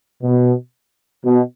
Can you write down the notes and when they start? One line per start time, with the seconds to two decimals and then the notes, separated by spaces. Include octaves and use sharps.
0.23 B2
1.25 B2